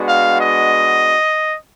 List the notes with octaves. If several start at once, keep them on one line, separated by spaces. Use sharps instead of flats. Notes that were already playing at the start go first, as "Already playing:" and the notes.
Already playing: G#3 B3 D4 F#4
F5
D#5